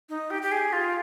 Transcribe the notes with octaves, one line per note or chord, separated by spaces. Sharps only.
D#4
G4
G4
G#4
F4